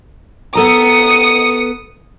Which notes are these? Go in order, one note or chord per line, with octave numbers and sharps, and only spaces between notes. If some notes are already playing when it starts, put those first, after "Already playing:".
B3 A4 A#5 D#6 C#7